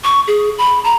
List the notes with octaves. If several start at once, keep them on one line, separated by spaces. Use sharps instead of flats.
C#6
G#4
B5
A#5